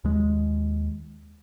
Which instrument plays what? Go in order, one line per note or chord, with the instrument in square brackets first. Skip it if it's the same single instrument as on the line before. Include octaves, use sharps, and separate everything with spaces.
[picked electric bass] D#2 G#3